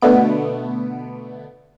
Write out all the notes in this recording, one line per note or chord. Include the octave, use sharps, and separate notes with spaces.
B2 D3 A3 B3 D7